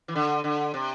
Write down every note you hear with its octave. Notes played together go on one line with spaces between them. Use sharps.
E3
D3
D3
C3